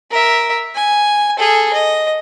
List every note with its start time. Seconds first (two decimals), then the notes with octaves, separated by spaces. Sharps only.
0.11 A#4 E5
0.75 G#5
1.37 G#4 A4
1.73 D#5